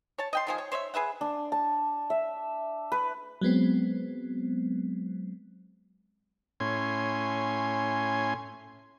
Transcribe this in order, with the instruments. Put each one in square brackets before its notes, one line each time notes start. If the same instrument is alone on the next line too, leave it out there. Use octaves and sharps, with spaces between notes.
[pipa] C#5 A5
D#5 G5 C6
D#3 F3 G#4
C#5
C5 C#5 D#5 E5
G#4 B4 E5 F#5
[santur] D4
A5
E5
B4
[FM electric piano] F#3 G#3 B3 C4
[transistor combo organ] A2 C#4 G#5 C6